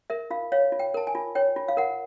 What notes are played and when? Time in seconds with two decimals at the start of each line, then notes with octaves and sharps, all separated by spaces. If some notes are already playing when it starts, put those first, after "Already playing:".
0.10 A#4 E5
0.31 F4 F5
0.52 C#5 F5
0.72 F4
0.79 G5
0.94 A#4 A5
1.07 G#5
1.15 F4
1.35 C#5 G5
1.56 F4
1.68 F5
1.77 A#4 F#5